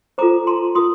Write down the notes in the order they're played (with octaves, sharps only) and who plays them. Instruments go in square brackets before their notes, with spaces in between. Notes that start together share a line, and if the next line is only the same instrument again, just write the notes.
[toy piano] F4 A4 C5 A#5 D6
A5 C6
F4 A#4 C6 D#6